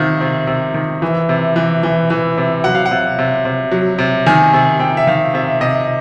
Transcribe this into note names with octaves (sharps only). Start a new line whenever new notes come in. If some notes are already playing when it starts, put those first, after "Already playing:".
Already playing: C3 D#3 F5
C3
C3
D#3
E3
C3
E3
E3
E3
C3
F#3 F#5
F5
F#5
C3
C3
C3
F#3
C3
D#3 G#5
C3
C3 G5
E5
D#3 F5
C3 E5
C3 D#5